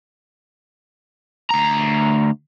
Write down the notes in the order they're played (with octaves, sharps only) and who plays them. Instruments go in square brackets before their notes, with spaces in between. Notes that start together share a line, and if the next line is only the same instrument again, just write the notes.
[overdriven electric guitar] D2 A#5